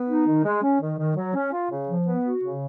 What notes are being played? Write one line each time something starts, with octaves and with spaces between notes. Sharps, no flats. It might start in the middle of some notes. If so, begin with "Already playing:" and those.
Already playing: B3
D#4
D#3
G#3
C#4
D#3
D#3
F#3
C#4
F4
C#3
F3
B3
F#4
C#3